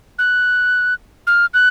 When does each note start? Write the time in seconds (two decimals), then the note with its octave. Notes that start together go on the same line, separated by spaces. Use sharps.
0.19 F#6
1.27 F6
1.54 F#6